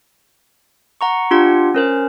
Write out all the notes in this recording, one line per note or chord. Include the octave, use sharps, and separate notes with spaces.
F#5 A#5 C#6
D4 F4 G4 F#5
C#4 A#4 C5